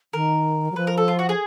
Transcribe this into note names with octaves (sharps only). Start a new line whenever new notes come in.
D#3 A#4
F#3
F3 B4
A#4
A4
F4
F#4
G#4